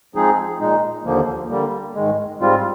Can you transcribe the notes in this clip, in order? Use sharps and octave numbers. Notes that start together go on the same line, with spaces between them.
F3 G#3 C4 D#4 G#4
A#2 G#3 D#4
D#2 D3 F3 A#3
D3 G3 A#3
G#2 D#3 G#3
G#2 G3 C4 F4